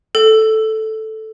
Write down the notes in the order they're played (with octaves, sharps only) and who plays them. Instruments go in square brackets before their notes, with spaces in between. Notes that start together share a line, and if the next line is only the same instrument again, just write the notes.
[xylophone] A4